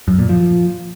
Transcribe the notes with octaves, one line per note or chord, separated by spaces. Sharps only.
F#2
A#2
F3